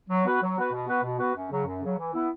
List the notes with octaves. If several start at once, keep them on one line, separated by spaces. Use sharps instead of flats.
F#3
B3 F#4 B4
F#3
B3 F#4 B4
B2
B3 F#4 B4
B2
B3 F#4 B4
F#2
C#3 F#3
F#2
C#3 F#3
E3
B3 E4